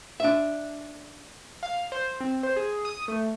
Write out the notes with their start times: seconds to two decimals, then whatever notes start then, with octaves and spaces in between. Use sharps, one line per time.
0.20 D4 E5
1.63 F5
1.92 C5
2.20 C4
2.43 C5
2.56 G#4
2.85 D#6
3.08 A3